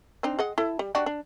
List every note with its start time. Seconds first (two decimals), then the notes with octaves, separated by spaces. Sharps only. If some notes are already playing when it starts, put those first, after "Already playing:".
0.23 C4 D4 D#4
0.39 G#4 D#5 F#5
0.58 E4 A4
0.79 G3
0.95 D4 F#4 G4
1.06 D4